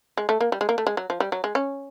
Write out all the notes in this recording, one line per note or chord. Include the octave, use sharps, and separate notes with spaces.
G#3
A3
A#3
G3
G#3
A#3
A3
G#3
F#3
F3
G3
F#3
G#3
C#4